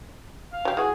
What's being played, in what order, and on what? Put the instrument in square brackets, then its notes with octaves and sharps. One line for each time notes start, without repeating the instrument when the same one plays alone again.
[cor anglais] F5
[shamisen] F#3 G4
[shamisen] E3 F#4 [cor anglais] G#4